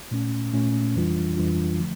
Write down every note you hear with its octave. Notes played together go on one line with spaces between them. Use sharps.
A#2 A3 C#4
A#2 A3 C#4
F2 E3 G3 D4 F4
F2 E3 G3 D4 F4
D3 F3 A3